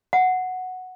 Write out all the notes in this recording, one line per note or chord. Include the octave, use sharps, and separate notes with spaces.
F#5